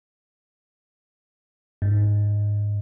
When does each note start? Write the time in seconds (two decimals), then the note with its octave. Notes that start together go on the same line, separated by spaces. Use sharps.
1.82 G#2